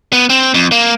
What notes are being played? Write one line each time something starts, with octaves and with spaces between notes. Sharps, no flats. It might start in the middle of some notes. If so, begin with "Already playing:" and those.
B3
C4
F2
A#3